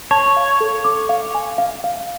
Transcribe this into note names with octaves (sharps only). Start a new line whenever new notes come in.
C#5 A5
F5
A4
D6
F5
G#5
F5
F5